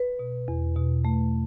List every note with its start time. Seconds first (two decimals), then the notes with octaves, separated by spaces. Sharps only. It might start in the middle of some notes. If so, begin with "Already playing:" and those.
Already playing: B4
0.19 B2
0.48 E2
0.76 B2
1.05 A3